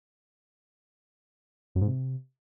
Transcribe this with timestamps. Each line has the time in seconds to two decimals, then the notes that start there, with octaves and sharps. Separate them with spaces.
1.75 F#2
1.81 G#2
1.87 C3